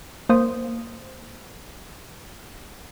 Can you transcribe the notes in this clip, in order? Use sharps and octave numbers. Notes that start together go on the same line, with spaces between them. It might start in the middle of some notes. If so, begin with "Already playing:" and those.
A#3 C5 D#6